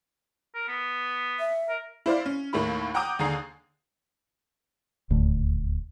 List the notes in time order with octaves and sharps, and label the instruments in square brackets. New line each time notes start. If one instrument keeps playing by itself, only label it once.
[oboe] A#4
B3
[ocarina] E5
[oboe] A#4
[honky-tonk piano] E4 C5 D5 F5
C#4
D#2 A2 A#3 E4 B5
F#5 G5 A#5 D6 D#6 G6
D#2 D3 G#4 G#5 A#5 C7
[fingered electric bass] D#1 D2 A2